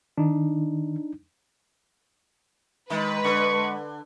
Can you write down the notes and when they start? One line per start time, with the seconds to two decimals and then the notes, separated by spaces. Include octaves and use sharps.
0.18 D#3 D4 D#4
2.90 D#3 G#3 B4
3.24 D3 C#6